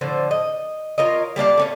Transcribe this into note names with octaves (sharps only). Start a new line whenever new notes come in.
A2 D3 F3 C5
D#5
F4 A#4 C#5 D#5
G3 A#3 D4 F4
A3 C4 C#4